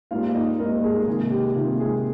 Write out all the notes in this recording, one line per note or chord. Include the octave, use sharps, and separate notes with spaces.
G#2 G3 A#3 F4 F5
D#4 D#5
G#2 G3 A#3 A#4
G#3 G#4
C3 D#3 G#3 A#3 G#4
G4
C3 D#3 A#3 F4
G#3 G#4